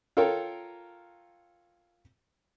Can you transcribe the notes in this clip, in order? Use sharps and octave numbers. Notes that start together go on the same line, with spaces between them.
F4 A4 A#4 C#5 G5